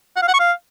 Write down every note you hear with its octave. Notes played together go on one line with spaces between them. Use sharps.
F#5
F5
F#5
C#6
F5